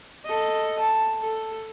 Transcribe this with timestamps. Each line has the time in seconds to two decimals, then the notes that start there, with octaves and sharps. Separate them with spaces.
0.25 A4 D#5
0.79 A5
1.21 A4